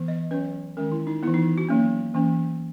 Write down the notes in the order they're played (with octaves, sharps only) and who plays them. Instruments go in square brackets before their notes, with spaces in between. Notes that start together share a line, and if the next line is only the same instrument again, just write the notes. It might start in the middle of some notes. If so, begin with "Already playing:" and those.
Already playing: [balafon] E3 B3
D#5
F#3 C#4 B4
D#3 G#3 C#4 A#4
E4
D#4
E3 B3 E4
D#4
F#4
F#3 A#3 C#4
E3 A#3 C#4